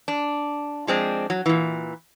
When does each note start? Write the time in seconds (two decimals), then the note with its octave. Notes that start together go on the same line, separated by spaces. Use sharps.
0.08 D4
0.87 F3 G#3 C4 D4
1.30 F#3
1.46 A#2 E3